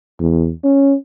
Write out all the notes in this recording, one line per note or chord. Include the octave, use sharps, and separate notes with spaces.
E2
C#4